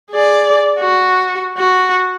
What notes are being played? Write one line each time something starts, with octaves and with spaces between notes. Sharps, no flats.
G#4 D5
F#4
F#4